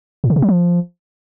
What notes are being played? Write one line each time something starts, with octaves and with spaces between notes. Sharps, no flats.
A2
C#3
C3
F#3
F3